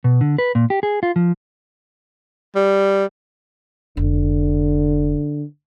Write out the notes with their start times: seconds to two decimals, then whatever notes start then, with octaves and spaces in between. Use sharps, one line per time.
0.04 B2
0.21 D3
0.38 B4
0.55 A#2
0.70 G4
0.83 G#4
1.03 F4
1.16 F3
2.55 G3
3.97 F1 D3